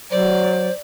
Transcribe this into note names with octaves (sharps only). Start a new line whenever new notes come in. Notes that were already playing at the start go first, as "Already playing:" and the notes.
F#3 C5 D5